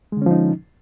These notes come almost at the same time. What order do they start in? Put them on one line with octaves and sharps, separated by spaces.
G#3 D3 C#4 F3 D#4